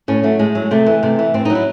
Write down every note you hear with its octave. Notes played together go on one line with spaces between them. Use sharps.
A2 C#4
F#3 A3
A2 G#3
F#3
C3 A3
E3
C3 A3
E3
A2 C4
D#4
F#3
E4